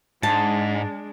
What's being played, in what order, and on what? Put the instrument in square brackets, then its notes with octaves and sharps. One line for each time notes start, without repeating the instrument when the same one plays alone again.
[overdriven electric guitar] G#2 [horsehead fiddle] G#3 D4 [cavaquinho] A5